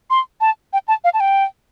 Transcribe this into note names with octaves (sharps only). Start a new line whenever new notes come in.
C6
A5
G5
A5
F5
A5
G5